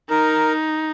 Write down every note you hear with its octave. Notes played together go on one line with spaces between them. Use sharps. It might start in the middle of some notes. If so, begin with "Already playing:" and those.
D#4 A#4